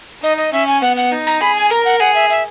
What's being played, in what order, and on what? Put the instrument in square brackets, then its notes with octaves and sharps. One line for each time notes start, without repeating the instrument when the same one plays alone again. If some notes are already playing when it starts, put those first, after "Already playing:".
[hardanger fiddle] D#4 [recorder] D#5
[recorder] D#5
[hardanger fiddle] C#4 [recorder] E5
[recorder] G#5
[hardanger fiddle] B3 [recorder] F#5
[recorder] F#5
[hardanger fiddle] D#4
[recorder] A#5
[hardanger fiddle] G#4 [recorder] B5
[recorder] G#5
[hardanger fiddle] A#4 [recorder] A#5
[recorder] F#5
[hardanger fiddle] G#4 [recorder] F#5
[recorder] E5
E5